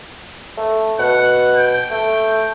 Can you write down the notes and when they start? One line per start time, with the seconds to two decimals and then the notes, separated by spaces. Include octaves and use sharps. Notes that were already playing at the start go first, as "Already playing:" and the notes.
0.57 A3
0.99 B2 F#5
1.56 G5
1.91 A3